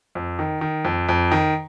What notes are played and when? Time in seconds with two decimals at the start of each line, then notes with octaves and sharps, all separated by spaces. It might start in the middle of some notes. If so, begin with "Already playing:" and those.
0.15 F2
0.39 D#3
0.61 D#3
0.85 F2
1.09 F2
1.31 D#3